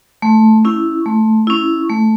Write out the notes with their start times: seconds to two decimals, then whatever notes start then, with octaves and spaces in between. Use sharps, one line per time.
0.22 A3
0.65 C#4 E4
1.06 A3
1.47 C#4 E4
1.89 A3